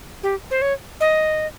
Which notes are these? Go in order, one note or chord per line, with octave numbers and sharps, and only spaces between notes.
G4
C5
C#5
D#5